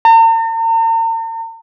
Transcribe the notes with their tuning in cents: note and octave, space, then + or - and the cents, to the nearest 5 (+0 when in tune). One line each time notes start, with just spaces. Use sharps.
A#5 -45